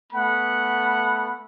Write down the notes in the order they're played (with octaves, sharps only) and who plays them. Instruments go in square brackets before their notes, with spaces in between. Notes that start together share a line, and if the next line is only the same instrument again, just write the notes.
[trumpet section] A3 B3 F#5 B5